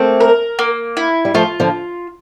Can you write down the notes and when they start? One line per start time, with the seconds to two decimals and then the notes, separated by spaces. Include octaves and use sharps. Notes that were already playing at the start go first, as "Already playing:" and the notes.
Already playing: A3 A#3 C4
0.20 A#4
0.59 A#3
0.97 E4
1.25 G3
1.34 F3 A3 F4
1.60 D3 F3